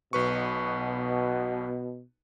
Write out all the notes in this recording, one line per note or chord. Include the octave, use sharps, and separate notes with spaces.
B1 B2 B4 C#6